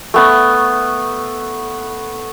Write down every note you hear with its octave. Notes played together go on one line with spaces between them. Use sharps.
A3 B3 C#6